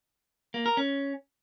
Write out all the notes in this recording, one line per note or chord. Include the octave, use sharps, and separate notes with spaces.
A#3
A#4
C#4